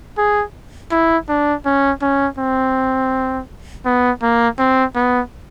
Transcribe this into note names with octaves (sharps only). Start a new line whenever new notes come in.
G#4
E4
D4
C#4
C#4
C4
B3
A#3
C4
B3